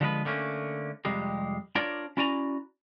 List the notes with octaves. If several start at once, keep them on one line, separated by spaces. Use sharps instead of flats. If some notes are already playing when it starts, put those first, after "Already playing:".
D3 F3 G#3 B3 A#4 B4
D3 A3 A#3 C#4
F2 C3 G3 G#3
D4 F4 A#4 C#5 D5
C#4 E4 F#4 D5 G#5 A#5